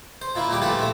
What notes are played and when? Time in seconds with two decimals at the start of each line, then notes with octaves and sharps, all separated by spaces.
0.22 C5
0.36 A#2 A#3 E4
0.50 A#2 G3 G4 D6
0.62 A#2 E3 F3 A3 G4 F#5
0.79 A3 C4